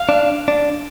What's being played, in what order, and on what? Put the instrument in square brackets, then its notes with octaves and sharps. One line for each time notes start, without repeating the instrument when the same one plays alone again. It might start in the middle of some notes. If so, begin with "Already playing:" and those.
Already playing: [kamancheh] F5
[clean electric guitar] D4
D4